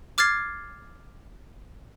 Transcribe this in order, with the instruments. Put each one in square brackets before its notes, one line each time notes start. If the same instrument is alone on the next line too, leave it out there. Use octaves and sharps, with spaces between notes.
[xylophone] D6 F6 G#6 A6 C7